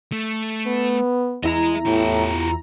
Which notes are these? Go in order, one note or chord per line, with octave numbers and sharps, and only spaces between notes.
A3
B3
E2 E4 G#4 D#5 A#5
A2 F4 G4